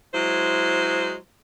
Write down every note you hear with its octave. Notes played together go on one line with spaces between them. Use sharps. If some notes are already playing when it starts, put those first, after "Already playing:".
F#3 G#3 E4 C5